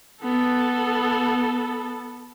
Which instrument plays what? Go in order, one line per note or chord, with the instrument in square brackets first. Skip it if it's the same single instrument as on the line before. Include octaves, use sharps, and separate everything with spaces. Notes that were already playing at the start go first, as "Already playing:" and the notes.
[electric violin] B3 A4